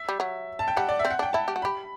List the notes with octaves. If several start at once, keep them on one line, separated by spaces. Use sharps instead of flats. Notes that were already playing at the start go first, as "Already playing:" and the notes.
Already playing: E5
G3
F#3
A5
G5
G3 F#5
D5
E5
C4
F#5
D4 G5
E4 A5
G4
F#4
G4 B5